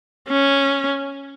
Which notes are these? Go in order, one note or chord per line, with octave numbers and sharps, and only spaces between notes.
C#4